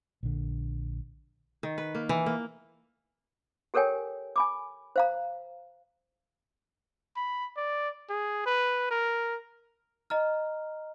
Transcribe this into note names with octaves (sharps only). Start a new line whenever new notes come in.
A#1 D3
D#3
B4
A#3
E3
A#3
G4 A4 A#4 C#5 G5 G#5
G#5 B5 D6
C5 F5 A#5
B5
D5
G#4
B4
A#4
D#5 A#5 F6